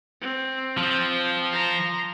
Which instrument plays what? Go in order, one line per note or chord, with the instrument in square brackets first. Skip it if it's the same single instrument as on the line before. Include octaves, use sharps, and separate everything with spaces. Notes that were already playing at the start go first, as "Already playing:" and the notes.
[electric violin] C4
[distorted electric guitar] F3
[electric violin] A#5 C6